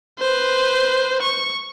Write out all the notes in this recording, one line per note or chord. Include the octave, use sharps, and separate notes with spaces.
B4 C5
C#6